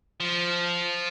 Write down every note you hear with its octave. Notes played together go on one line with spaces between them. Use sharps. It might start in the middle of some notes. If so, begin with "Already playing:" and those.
F3